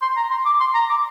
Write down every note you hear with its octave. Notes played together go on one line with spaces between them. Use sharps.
C6
A#5
C6
D6
C6
A#5
D6